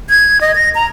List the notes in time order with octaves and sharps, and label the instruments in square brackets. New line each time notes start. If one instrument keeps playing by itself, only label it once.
[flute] G#6
D#5
A#6
A#5